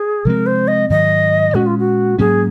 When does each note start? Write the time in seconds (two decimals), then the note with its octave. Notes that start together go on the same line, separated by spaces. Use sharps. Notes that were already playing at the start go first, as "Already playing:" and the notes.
Already playing: G#4
0.25 C3 F3 G#3 C4 A#4
0.46 C5
0.68 D#5
0.90 G#2 D#3 F#3 D#5
1.54 A#2 G#3 C#4 F#4
1.67 F4
1.79 F#4
2.18 G#2 F#3 A#3 C#4 G#4